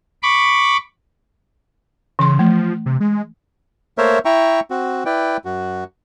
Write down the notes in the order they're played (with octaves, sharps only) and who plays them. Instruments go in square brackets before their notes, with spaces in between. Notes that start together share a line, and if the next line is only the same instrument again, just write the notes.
[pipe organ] B5 C#6 D6
[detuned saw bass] C#3 [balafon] E3 C6
[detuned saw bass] F3 [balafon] A3
[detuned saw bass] C3
G#3
[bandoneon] A3 A#3 A#4 C5 C#5 E5
E4 E5 G5 A#5 C#6
C4 F#4
E4 B4 D5 G5
F#2 F#4